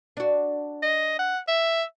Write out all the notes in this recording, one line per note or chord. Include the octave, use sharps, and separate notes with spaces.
D4 F#4
D#5
F#5
E5